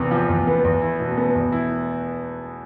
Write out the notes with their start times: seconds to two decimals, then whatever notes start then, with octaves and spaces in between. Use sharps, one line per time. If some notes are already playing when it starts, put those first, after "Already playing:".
Already playing: E2 C3 B3
0.11 F3
0.29 E2
0.47 B3
0.65 E2
0.82 E4
1.00 B2
1.18 B3
1.35 E2
1.52 E4